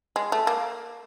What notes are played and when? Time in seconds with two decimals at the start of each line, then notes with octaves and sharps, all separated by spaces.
0.16 G#3
0.32 A3
0.47 A#3